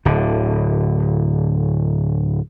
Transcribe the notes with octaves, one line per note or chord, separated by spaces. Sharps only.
D1 D3